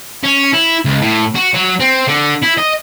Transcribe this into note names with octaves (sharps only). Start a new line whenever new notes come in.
C#4
E4
C#2
A2
F#4
F#3
C4
D3
E4
D#5